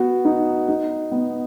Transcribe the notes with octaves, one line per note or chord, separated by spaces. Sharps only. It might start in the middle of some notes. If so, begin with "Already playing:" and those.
Already playing: B3 F#4
D#4
D#4
B3